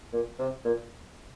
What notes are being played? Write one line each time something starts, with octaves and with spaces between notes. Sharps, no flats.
A#2
C3
A#2